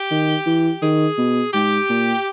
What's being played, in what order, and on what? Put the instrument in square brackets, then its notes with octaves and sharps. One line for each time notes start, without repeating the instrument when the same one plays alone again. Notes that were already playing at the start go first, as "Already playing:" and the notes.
Already playing: [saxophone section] G4
[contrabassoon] D#3
E3
[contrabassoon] D#3 [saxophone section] G#4
[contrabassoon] B2
[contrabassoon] G#2 [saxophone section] G4
[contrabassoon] A#2